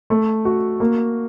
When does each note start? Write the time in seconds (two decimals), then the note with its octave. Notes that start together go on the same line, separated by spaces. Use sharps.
0.10 A3
0.45 F#4
0.80 A#3